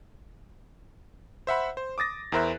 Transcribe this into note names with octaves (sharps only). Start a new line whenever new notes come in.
C5 E5 F#5 B5
C5
D6 D#6 A6 A#6
E2 E4 A#4 C5 E5 F#6